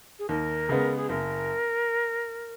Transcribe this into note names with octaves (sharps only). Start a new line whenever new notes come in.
G#4
D#2 A#4
C#3 G#3 B3
G#4
F#1 A#4